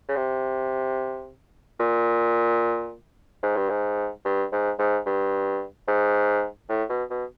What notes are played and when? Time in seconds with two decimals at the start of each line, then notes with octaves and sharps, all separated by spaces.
0.09 C#3
0.16 C3
1.80 A#2
3.43 G#2
3.56 G2
3.70 G#2
4.25 G2
4.52 G#2
4.79 G#2
5.06 G2
5.88 G#2
6.69 A2
6.89 B2
7.10 B2